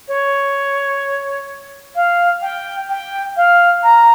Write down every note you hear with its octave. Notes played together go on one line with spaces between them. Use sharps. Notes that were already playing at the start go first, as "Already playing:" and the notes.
C#5
F5
G5
G5
F5
A#5